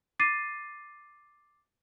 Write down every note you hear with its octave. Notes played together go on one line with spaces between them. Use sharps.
D6 A6 C7 D#7